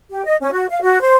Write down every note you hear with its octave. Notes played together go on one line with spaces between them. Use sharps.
G4
D#5
C#4
F#4
F5
F#4
C5